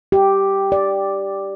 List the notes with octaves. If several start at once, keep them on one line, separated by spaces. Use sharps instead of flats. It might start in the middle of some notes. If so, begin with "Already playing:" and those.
G4
D5